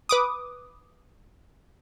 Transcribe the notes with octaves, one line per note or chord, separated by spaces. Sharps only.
B4 D6 D#6